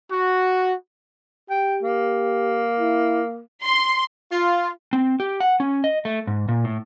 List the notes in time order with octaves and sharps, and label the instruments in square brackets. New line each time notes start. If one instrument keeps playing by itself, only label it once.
[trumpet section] F#4
[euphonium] G4 [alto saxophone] G5
[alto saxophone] A#3
[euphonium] E4
[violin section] C6
[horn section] F4
[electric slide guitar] C4
G4
F#5
C#4
D#5
A3
G#2
A#2
A2